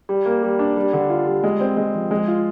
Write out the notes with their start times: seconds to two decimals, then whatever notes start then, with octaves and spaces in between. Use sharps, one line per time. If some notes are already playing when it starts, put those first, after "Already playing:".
0.09 G3
0.26 A#3
0.43 G3
0.59 D4
0.77 G3
0.93 D3
1.10 F4
1.27 G3
1.43 G#3
1.60 C4
1.77 G#3
1.94 F3
2.11 G#3
2.28 F4